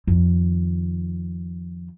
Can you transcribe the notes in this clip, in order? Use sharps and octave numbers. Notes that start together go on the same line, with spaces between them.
F2 D#3